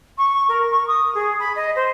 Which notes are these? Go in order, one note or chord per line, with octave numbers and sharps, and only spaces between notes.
C#6
A#4
C#6
D#6
G#4
B5
D#5
C5